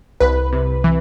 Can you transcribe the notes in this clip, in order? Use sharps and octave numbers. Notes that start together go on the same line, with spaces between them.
C2 B4
C3
E3